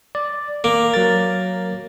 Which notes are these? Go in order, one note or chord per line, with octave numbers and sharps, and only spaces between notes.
D5
A#3 D6
F#3 A#4 A6